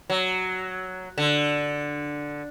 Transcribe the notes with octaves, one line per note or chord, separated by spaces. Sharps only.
F#3
D3